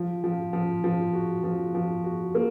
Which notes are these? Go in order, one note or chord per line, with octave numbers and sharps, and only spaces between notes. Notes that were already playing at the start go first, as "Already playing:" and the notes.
Already playing: F3
F3
F3
F3
F#4
F3
F3
F#4
A#3